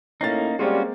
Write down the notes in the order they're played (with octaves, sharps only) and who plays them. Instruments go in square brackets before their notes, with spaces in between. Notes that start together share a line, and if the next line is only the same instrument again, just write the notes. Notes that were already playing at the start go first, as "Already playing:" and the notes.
[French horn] A2 [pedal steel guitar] A#3 C#4 D#4 [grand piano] A6 A#6 C7
[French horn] G3 [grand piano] G#3 A#3 C4 [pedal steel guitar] C#4 F4 F#4